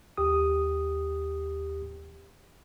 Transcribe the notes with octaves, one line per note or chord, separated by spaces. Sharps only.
D#2 G4 D#6